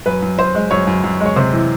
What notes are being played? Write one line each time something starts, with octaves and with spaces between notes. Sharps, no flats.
F#2 B4
F#2
F#2 C5
G#3
F#2 C#5
F#2
F#2
G#3
C#5
C3 C5
E3